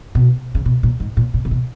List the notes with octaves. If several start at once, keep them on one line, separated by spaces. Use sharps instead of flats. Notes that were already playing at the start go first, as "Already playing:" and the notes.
B2
C#3
B2
A#2
G#2
A#2
A#2
A#2
B2